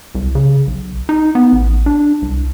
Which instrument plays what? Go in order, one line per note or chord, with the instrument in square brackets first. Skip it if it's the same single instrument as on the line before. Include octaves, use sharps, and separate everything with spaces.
[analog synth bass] C2
C#3
B1
D#4
B3
A1
D4
C2